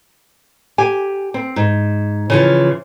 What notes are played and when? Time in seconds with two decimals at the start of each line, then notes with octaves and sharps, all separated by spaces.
0.78 G4 G#5
1.34 C4
1.56 G#2
2.30 C#3 E3 F3